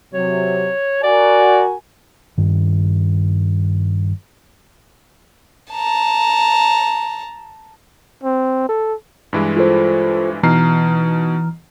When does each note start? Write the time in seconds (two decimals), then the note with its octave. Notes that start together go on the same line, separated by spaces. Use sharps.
0.14 C3 F#3 C#5
1.03 F#4 A#4 D5 G#5
2.38 G2 D#3
5.73 A5 A#5
8.23 C4
8.69 A4
9.33 G2 E3 G#3
9.57 F4 A4 C5
10.43 B2 E3 D#4 A#5 F6 C7